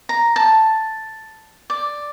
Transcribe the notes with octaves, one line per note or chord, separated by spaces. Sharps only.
A#5
A5
D5